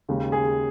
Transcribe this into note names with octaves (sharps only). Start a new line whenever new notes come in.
D#2 C#3 G#3
G#4